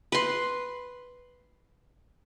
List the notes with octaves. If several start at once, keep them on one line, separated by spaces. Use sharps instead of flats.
B4 C6